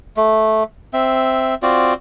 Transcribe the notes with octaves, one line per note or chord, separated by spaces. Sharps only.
A3
C4 E5
C4 F4 F#4 D5